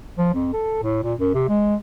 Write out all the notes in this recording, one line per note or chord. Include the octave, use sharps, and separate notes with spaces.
F3
F2
A4
A2
A#2
F#2
C3
G#3